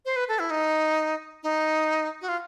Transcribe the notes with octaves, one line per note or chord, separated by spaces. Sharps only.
C5
B4
A4
E4
D#4
D#4
F#4
F4